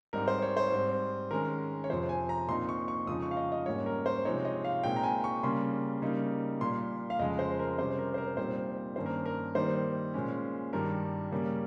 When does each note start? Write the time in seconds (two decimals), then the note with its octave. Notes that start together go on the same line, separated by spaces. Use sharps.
0.13 G#2 G3 C4 D#4 A#4
0.28 C5
0.42 C#5
0.57 C5
0.72 G#2 G3 C4
1.31 D#3 G#3 C#4 A#4
1.84 C#5
1.89 F2 C3 F3 C5
2.09 G#5
2.29 A#5
2.48 A#2 F3 C4 D#4 C6
2.69 C#6
2.88 C#6
3.07 F2 C#3 F3 G#3 D#4 D#6
3.22 C#6
3.31 F5
3.37 D#5
3.52 D#5
3.66 G#2 G3 A#3 C#4 C#5
3.86 A#4
4.06 C5
4.25 C3 F3 G#3 C4 D#4 C#5
4.45 D#5
4.64 F5
4.83 A#2 G#3 C4 D#4 G5
4.96 A#5
5.03 G#5
5.24 C#6
5.43 C#3 G3 A#3 C6
6.02 C#3 G3 A#3 D#4
6.61 A#2 G3 A#3 C6
7.10 F5
7.19 F2 C#3 G#3 D#5
7.39 C5
7.59 A#4
7.79 C3 G3 C#4 C5
7.99 A#4
8.14 C5
8.18 A#4
8.37 A#2 G3 C4 D#4 C5
8.96 G2 D#3 A#3 C#4 C5
9.06 A#4
9.26 A#4
9.55 D#3 G3 A#3 D#4 C5
10.14 A#2 G#3 C#4
10.73 G2 D#3 G3 A#4
11.31 C#3 G3 A#3 C#4